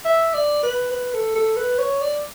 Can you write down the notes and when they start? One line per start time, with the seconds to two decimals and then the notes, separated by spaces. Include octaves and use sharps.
0.05 E5
0.34 D5
0.63 B4
0.92 B4
1.14 A4
1.35 A4
1.57 B4
1.78 C#5
2.01 D5